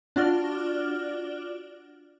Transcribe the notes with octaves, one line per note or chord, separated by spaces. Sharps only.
D4 F4 F#4 D5 F6 G7